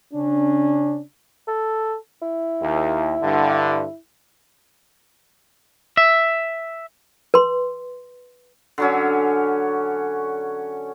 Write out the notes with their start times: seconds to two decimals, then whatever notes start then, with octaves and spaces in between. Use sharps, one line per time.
0.13 C#3 C#4 D4
1.48 A4
2.22 E4
2.62 D#2
3.22 G2 D3
5.97 E5
7.34 B4 C6
8.78 D3 F#3 C#4